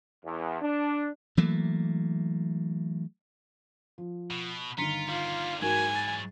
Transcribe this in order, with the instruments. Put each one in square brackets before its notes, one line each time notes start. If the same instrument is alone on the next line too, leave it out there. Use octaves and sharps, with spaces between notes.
[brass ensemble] E2
D4
[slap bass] E3 F#3 A3 A#3
[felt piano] F3
[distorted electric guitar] B2
[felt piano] G1 D#3 [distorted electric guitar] F4 [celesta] A#5 B6 C#7
[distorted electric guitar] G3 A#3 [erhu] F4
[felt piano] G#2 [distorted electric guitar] E3 F#3 [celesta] F#4 A#4 G#6 [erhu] G#5
[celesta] A6